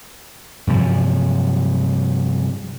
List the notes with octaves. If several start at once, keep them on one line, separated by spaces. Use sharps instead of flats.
G2 C3 F3 F#3